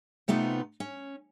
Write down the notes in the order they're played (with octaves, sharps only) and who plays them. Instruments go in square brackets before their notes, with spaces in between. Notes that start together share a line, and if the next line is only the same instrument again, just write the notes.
[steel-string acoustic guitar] C3 A3 B3 D#4 F4
C#4